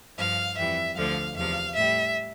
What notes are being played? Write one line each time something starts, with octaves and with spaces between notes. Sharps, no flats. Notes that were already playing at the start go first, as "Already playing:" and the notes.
G2 F3 F5
F2 E3 G3 E5
D2 D3 F3 F5
E2 C3 F3 F5
A2 G3 E5